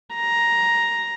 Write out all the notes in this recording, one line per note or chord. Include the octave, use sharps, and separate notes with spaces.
A#5